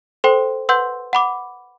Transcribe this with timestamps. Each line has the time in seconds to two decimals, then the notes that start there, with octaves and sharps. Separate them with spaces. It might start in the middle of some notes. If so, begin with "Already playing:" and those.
0.24 A4 C5 G5 C6
0.69 B4 F#5 C6 E6 G6
1.13 F#5 B5 D6